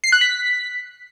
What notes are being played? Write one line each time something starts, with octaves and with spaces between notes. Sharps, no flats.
C7
F#6
B6